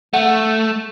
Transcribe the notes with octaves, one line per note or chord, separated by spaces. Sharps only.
A3 F#5